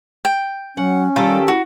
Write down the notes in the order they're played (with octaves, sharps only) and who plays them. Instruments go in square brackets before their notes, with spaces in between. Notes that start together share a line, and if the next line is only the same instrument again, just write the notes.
[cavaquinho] G5
[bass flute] F#3 [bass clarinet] C#4 [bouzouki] F#5
[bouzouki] D#3 G4 A4 [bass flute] G3 [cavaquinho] F4
[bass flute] E4 [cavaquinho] F#4